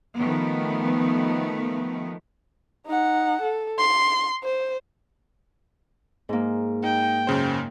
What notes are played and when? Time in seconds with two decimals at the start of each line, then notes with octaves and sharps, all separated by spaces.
0.17 D#3 F3 A3 B3
2.87 D#4 F#5
3.41 A4
3.78 C6
4.43 C5
6.29 G#2 A#3
6.84 D#4 G5
7.27 F#2 C#3 C5